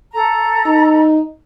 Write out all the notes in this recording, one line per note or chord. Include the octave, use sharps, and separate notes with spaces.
A4 A#5
D#4